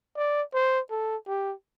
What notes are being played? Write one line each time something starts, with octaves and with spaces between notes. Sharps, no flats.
D5
C5
A4
G4